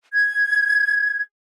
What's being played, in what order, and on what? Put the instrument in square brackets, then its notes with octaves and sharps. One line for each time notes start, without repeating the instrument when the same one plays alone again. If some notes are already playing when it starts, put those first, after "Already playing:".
[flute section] G#6